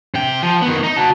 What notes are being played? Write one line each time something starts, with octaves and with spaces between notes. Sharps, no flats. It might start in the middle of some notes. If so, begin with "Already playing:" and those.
C3 G5
F3
D#3 B3
D#4
F#4 A5